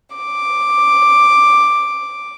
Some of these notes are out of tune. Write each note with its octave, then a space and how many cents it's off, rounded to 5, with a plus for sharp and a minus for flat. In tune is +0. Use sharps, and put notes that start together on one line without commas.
D6 +5